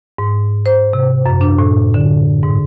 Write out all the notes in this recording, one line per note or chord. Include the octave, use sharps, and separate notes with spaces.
G#2
C5
C3
F#2
D4
A2
D3
G#2